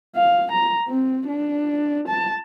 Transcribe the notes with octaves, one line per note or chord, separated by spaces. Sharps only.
F5
A#5
C4
D4
A5